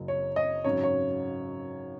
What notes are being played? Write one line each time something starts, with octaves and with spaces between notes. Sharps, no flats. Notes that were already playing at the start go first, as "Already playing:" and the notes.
Already playing: F#1 F#2 C#3
C#5
D#5
G#1 F#2 C#3 F#3 C#5
C#5